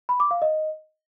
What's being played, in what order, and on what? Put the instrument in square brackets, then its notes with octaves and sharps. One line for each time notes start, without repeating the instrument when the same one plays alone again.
[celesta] B5
D6
F5
D#5